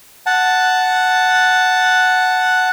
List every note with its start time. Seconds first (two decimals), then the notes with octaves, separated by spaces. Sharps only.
0.26 F#5 A5